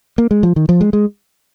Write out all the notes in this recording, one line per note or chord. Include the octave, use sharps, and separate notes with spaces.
A#3
G#3
F3
D#3
F3
G#3
G#3